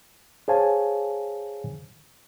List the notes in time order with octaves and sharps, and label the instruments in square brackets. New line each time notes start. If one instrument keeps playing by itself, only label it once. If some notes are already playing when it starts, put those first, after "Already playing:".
[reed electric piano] G#4 C5 C#5 F5 G#5 A5